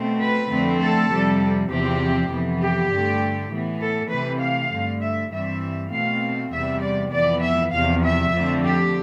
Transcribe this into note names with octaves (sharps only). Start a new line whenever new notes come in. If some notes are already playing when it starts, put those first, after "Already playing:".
Already playing: B2 A3 C4
B4
F2 D3 A3 C4
A4
F2 C3 G3
E2 C3 F3 C4 G4
F2 C3 E3 B3
G4
G2 D3 A3
A2 E3 B3
A4
C3 E3 A3 C4 B4
F5
G2 D3 A3
E5
G2 E3 G3 C4 E5
B2 A3 C4 F5
E2 C3 G3 B3 E5
D5
F2 E3 B3 D5
E5
E2 C3 F3 F5
E5
F2 D3 F3 A3 C4
G4